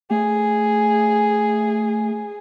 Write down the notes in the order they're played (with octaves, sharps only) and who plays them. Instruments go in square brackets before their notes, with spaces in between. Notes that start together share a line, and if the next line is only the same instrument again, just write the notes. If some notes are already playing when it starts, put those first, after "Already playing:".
[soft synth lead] A3 [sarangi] G#4